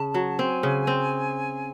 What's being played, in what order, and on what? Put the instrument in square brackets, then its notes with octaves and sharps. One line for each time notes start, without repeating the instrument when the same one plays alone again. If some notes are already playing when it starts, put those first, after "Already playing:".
Already playing: [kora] C#3 [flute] A5
[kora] F#3
[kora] C4 [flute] G#5
[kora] C#3
C4